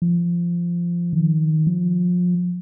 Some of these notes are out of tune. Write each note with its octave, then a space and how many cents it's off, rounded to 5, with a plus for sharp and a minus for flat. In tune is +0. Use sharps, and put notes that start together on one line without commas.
F3 -15
D#3 +10
F3 +30